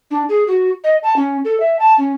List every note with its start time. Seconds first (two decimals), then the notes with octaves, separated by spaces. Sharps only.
0.11 D4
0.29 G#4
0.48 F#4
0.84 D#5
1.03 A5
1.16 C#4
1.45 A4
1.60 E5
1.79 A5
1.98 C#4